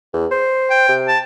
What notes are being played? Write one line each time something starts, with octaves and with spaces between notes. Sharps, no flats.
E2
C5
G5
C3
A5